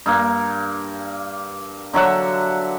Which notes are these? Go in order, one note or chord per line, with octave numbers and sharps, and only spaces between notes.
G2 A#3
D3 F#3 E5 F#5